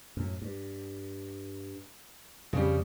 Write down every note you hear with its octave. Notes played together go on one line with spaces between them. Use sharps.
F#2 A2
G2
F2 C#3 F3 G3